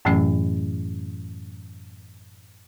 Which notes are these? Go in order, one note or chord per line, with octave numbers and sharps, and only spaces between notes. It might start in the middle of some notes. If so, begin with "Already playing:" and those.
F#2 A2 E3 F#3 A3 C#4